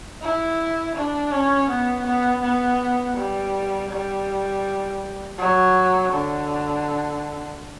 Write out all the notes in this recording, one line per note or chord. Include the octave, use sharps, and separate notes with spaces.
E4
D4
C#4
B3
B3
B3
G3
G3
F#3
D3